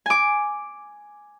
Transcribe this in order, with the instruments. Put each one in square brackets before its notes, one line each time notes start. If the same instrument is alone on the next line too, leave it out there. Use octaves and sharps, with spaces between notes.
[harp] G#5 D6